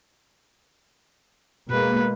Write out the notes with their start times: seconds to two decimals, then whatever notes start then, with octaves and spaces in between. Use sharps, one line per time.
1.71 B2 G#3 A#3 B4